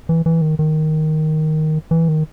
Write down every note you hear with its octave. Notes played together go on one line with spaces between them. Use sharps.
E3
E3
D#3
D#3
E3
D#3